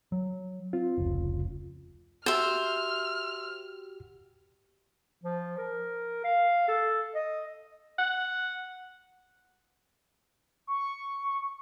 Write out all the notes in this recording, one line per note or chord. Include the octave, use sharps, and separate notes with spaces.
F#3
C4 F4
F1 C#2
F#4 G4 C5 E5 F6
F3
A#4
F5
A4
D#5
F#5
C#6